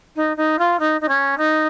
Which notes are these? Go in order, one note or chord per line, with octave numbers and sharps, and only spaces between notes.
D#4
D#4
F4
D#4
D#4
C#4
D#4